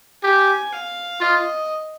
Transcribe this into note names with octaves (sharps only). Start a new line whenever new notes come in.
G4 G#5
F5
F4 D#5